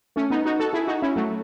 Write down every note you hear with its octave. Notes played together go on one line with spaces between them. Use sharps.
A3 C#4
B3 D#4
D#4 F#4
F#4 A4
E4 G#4
D#4 F#4
C#4 E4
F#3 A3